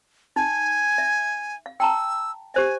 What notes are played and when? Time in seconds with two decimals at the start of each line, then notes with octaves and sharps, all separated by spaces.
0.36 D#4 G#5
0.98 E5
1.66 F5
1.80 G5 A5 A#5 E6
2.54 G4 C5 E5 G#5